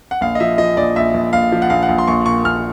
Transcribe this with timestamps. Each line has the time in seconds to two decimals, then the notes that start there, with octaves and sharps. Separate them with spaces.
0.11 F#5
0.21 A#1 F5
0.35 D#5
0.40 F3 E5
0.58 F3 D#5
0.77 A#1 D5
0.96 A#1 E5
1.14 A#1
1.33 A#1 F5
1.52 F3
1.62 F#5
1.70 A#1 F5
1.83 F#5
1.89 A#1
1.98 C6
2.07 A#1 C#6
2.26 A#2 C#6
2.44 A#1 F6